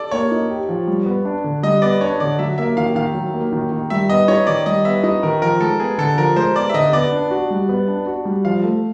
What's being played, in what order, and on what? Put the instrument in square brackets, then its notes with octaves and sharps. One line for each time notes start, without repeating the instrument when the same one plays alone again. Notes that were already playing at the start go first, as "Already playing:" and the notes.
Already playing: [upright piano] A4 D5
[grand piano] A#3 [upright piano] C#5
[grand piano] D#4
G4
F3
G3
B3
D4
D3
[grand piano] G3 [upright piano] D#5
[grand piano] B3 [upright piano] D5
[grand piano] D4 [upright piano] C#5
[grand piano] D3 [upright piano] D5
[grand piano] F#3 [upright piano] E5
[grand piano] A#3 [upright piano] E5
[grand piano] D#3 [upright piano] F5
[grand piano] D#3 [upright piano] F5
[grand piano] F#3
A#3
D#3
D#3
[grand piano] G3 [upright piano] E5
[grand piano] B3 [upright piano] D#5
[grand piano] D#4 [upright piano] C#5
[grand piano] D#3 [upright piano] D5
[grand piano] G3 [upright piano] D#5
[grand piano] B3 [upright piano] E5
[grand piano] D#4 [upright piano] D#5
[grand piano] D#3 [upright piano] A#4
[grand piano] F3 [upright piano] A#4
[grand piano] G#3 [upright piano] A4
[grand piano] B3 [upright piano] G#4
[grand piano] D3 [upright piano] A4
[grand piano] F3 [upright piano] A#4
[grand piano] G#3 [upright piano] C5
[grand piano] B3 [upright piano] D5
[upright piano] E5
[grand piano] D3 [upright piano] D#5
[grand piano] B3 [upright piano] D5
[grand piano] D4
F#4
G3
B3
D4
F#4
G3
[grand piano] F3 [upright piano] F5
[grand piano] A3